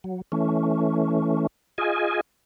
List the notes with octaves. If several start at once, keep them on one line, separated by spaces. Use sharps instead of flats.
F#3
E3 A3 C#4
F4 G#4 D#5 G#5